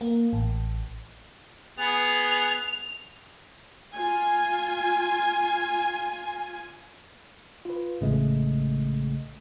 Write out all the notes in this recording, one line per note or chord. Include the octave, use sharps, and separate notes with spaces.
A#3
A1
B3 G#4 F7
F4 G#5
F4 B4
A1 C#3 G#3 A3 D#5